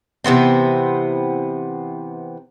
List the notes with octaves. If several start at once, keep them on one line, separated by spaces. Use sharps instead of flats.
C3 E3 B3 C4